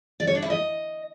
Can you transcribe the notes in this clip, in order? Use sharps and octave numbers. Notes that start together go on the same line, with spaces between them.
D5
C#5
D4
E4
D#5